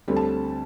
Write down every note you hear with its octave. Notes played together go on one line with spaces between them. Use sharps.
D2 D3 G3 C4
A5